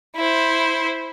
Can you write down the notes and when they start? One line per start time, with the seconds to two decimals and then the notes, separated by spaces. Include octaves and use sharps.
0.16 E4 C5